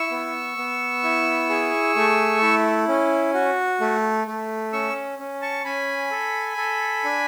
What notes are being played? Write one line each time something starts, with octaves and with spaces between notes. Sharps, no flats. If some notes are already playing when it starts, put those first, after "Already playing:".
Already playing: E4 C#6 E6
B3
B3
E4
G#4
A3
E4
C#4
F#4
A3
A3
C#4 C#6 E6
C#4
A5 C#6
C#4 G#5 B5
A4
A4
D4